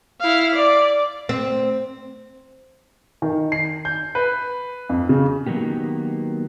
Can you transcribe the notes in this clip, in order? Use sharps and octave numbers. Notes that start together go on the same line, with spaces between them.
E4 F5
D5
C4
D#3
C7
G6
B4
F2
C#3
D#3 F#3 A#3 B3 G4